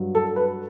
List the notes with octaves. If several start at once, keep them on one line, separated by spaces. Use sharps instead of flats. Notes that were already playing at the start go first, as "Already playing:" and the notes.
Already playing: G2 F#3
A4
B4